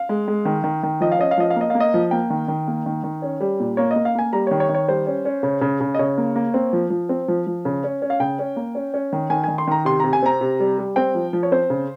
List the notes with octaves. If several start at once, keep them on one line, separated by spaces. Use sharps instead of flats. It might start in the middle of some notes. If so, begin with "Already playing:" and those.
Already playing: F5
G#3
G#3
D#3
D#3
D#3
F3 D#5
F5
C#4 D#5
F5
F3 D#5
F5
A#3 D#5
A#3 F5
D#5
F3
A#3 G5
D#3
D#3
A#3
D#3
D#3
C#4
G3
A#2
A#3 C#5
D#5
A#3
F5
A#3 G#5
G3 A#5
C#5
D#3
C#5
D#3
C#5
G3 C5
C#4
C#4
C#3
C#3
C#3
D#5
C#3 C#5
A#3
A#3
C4
F3
F3
C4
F3
F3
C#3
C#4
C#4
F5
C#3 G5
C#4
A#3
C#4
C#4
D#3
D#3 G#5
D#3 G#5
C6
D#3 A#5
C3 C6
C3 A#5
G#5
C4 A#5
C3
G3
G3
C4 G5
F3
F3
C#5
C4 C5
C#3